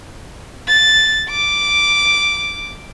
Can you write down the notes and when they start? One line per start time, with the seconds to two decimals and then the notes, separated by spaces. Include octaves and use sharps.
0.67 A6
1.30 D6